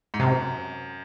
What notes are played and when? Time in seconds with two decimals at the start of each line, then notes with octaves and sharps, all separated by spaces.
0.14 G#2
0.20 F#2 C3